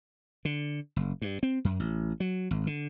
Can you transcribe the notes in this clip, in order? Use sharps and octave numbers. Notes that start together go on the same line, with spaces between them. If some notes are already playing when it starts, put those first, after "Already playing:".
D3
F#1
G2
C4
F#2
A1
F#3
G#1
D3